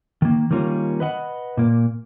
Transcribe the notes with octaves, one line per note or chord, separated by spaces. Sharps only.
D#3 A#3
D#3 G3 A#3 C#4 F4
B4 D#5 F#5
A#2 A#3